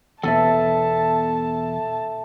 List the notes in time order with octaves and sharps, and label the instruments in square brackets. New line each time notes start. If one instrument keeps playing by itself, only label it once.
[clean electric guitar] E2 B2 [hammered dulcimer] A4 E5 [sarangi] A5